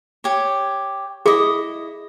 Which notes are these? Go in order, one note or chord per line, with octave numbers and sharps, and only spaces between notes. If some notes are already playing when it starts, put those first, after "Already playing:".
G4 C#5
E4 G#4 D#5 D6